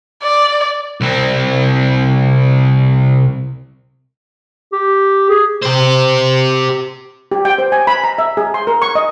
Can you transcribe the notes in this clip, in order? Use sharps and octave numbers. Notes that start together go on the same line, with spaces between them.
D5
C2 C4
G4
G#4
G4 C5
G4
G5
C5
G#5
B5
A#5
E5
G#4
C6
A#4
C#6
D#5